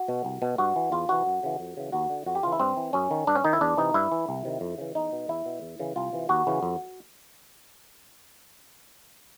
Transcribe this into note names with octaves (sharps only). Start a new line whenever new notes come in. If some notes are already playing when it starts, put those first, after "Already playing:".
Already playing: F#4
B2
C2
B2
G2 F#4
E3
E2 F4
C3 E3 F#4
F#2
C#3 E3
F2
C#3 E3
D#2 F#4
D3
F2 F#4
G4
C#3 E3 F4
E4
G2 C4
E3
F#2 C#4
D#3
G2 D4
C#4
D#3 D#4
E4
E2 D4
C3 E3 D#4
G2 E4
E3
C2
C3 D#3
F2
C#3 E3
E2 D#4
B2
E2 E4
B2
E2
C#3 E3
C2 F4
C3 E3
D#2 F#4
C#3 E3
F2